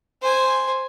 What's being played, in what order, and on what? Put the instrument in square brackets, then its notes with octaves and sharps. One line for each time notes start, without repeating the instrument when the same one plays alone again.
[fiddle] C5 G#5